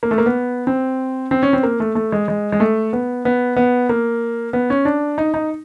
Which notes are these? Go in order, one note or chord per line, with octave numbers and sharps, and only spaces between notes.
A#3
A3
A#3
B3
C4
C4
C#4
C4
A#3
A3
A3
G#3
G#3
G#3
A3
B3
B3
B3
A#3
B3
C#4
D4
D#4
D#4